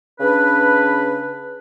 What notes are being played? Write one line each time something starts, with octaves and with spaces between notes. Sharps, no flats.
C#3 D4 B4